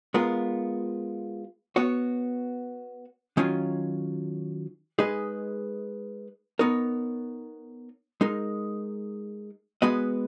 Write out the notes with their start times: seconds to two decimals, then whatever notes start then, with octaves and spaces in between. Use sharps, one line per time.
0.14 G#3 B3 F4 A#4
1.76 B3 F#4 C#5
3.37 D#3 F#3 C#4 F4
4.99 G#3 D#4 G#4 B4 D#5
6.59 B3 D#4 A#4 C#5
8.21 G#3 D#4 A#4
9.82 G#3 B3 F#4 B4 D#5